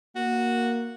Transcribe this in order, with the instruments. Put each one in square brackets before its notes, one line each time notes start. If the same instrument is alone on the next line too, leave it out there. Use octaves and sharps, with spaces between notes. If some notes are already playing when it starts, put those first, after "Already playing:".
[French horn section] A#3 [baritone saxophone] F#4